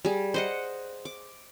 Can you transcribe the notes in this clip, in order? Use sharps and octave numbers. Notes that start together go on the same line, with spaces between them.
G3 G#4
C5 D#5 F#5
D6